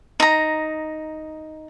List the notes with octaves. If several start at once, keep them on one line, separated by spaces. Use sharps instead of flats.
D#4 A#5